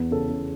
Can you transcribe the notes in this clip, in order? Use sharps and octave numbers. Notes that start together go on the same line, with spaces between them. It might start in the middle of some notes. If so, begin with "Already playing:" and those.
Already playing: E2 B3
C#3 A4
C#3